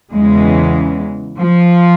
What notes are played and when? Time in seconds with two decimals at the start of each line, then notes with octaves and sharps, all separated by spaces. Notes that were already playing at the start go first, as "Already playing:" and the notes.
0.13 E2 C#3 E3 G#3
1.38 F3